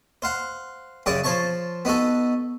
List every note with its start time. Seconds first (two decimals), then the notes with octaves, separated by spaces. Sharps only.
0.22 C5 F5 F#5
1.06 F#2 C#3 D5 F#5 C#6 D#6
1.24 F3 C5 C#5 A5 C#6
1.85 B3 D#4 F#4 A4